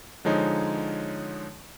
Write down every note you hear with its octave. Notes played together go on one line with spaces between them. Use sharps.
D3 F3 G#3 D#4 C#5